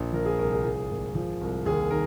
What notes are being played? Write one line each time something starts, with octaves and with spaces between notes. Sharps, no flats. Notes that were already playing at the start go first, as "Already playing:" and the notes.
Already playing: A#1
F3 A#4
G#4
C2 A#4
G#4
F3
G#1
F3
C2
D#2 G#4
D#3 A#4